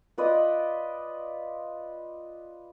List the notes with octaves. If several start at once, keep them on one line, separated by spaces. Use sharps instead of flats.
F4 B4 D5 D#5